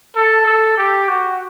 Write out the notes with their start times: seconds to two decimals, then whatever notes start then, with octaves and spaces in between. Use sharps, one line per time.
0.16 A4
0.46 A4
0.78 G4
1.08 F#4